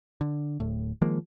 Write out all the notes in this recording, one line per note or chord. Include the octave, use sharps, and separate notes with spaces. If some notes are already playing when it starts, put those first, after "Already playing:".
D3
D1 A2
D#3 F3 G#3 A#3